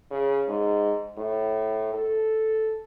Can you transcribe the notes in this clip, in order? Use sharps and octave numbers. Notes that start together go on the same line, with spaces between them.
C#3
G#2
A2
A4